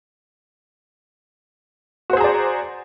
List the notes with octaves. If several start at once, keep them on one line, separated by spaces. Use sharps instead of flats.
F#4 G#4 C5 D5 A#5